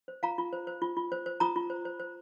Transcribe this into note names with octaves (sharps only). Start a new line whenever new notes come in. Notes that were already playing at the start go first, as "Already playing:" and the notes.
C5
F4 F5 A#5
F4
C5
C5
F4
F4
C5
C5
F4 A#5 D#6
F4
C5
C5
C5